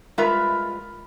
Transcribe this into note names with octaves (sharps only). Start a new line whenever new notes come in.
G3 G#3 F4 A#4 B4 E5